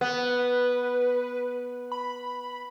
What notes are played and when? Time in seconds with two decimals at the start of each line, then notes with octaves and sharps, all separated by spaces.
0.01 B3 B4
1.92 B5